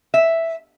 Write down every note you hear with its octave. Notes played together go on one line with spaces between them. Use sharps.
E5